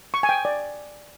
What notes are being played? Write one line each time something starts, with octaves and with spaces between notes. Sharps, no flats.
C#6
G#5
G5
D5